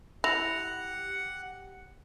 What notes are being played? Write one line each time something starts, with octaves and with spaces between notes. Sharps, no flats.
E4 G4 F#5 A#6 F7